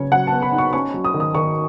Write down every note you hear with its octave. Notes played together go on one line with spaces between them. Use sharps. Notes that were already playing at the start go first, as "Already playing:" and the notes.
Already playing: C#3 F#3 B3 C#5
F#3 F#5
A5
B3
B5
D#4
C#6
C#4 C#6
F#3
D#6
D#3
D#6
D#3 C#6